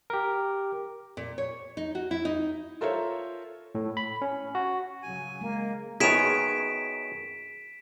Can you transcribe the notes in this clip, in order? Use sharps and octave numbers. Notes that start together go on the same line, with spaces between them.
G4 A#4
A#2
C#5
D#4
F#4
E4
D#4
F4 A4 A#4 C5 C#5 E5
A2
B5
C#4
F#4
C#3 F#3 G#5
G#3 A#3
F#2 D#3 B3 G#4 C#5 B6 D7 E7